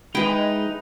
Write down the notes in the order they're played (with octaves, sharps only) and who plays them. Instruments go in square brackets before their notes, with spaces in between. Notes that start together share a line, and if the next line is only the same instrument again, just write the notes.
[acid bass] G#3 [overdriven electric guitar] D#4 [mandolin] E4 B4 [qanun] G5